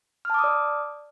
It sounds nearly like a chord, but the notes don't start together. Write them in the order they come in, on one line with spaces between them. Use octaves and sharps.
F6 A5 D6 D#6 D5